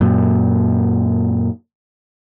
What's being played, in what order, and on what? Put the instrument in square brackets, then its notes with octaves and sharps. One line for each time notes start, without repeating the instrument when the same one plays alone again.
[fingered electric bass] F#2 A#2